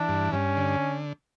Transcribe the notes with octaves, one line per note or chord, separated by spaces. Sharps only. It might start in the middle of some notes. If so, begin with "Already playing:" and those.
Already playing: E3 D4
G2
G2 C#4
D3